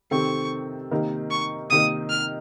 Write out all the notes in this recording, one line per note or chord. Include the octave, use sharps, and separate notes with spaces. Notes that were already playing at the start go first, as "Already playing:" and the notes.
C3 D#3 A3 C4 C#6
C3 D#3 A#3 D#4 A#4
C#6
C3 D#3 A#3 D#4 D#6
F6